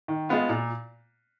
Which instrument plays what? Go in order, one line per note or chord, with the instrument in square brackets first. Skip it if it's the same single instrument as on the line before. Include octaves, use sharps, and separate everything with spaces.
[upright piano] D#3
G#3 B3 F4
A#2